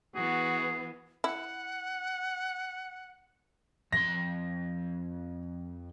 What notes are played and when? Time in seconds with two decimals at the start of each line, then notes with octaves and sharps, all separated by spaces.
0.15 E3 B3 F#4 G#4
1.24 E4 F#5
3.93 F2 C6 A#6